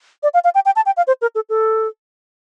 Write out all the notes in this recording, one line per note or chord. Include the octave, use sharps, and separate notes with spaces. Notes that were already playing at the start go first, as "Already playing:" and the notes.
D5
F5
F5
G5
G5
A5
G5
F5
C5
A#4
A4
A4